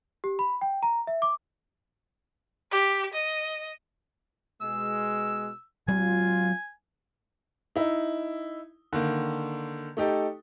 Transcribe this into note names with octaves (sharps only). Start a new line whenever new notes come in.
G4
B5
G5
A#5
E5
D6
G4
D#5
B2 G#3 E6
F#3 G#3 C4 F4 G#5
D#4 E4
D3 D#3 A#3
A3 D#4 G4 A4